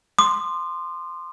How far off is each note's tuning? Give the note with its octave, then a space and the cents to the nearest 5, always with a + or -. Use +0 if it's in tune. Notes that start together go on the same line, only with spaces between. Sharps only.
C6 -5 D#6 -45